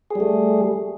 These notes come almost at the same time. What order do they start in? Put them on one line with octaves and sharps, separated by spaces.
G#4 G3 A3